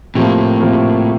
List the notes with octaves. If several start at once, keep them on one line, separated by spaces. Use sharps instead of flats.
A2 C3 F3 A#3
C3 F3 A#3